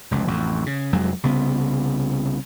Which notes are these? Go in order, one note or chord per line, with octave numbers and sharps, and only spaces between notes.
F1 C#2
A1 F2
C#3
F1 F2 F#3 G#3
C2 C#3 B3